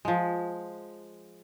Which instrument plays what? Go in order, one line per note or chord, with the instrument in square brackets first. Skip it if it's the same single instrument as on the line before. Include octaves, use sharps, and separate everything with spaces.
[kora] F3 G#3